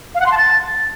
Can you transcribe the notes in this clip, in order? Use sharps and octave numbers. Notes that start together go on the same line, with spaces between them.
F5
F#5
C6
A5
A6